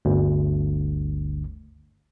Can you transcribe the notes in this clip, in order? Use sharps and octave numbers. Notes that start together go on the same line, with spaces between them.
G1 D2